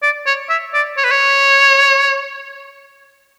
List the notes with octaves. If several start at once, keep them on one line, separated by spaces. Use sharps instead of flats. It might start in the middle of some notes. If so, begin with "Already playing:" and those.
D5
C#5
E5
D5
C#5
B4
C#5